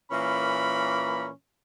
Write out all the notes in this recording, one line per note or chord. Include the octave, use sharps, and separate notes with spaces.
A#2 E3 A#3 C#4 B5